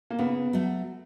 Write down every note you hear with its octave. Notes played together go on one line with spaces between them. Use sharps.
A#3
C#3 B3
F#3 A3